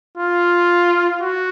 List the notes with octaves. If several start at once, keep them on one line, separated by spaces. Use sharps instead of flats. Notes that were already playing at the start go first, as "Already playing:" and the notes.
F4
F#4